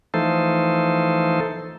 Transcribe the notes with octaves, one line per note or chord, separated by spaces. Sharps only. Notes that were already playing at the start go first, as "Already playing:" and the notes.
E3 F3 A3 D#4 A4 C5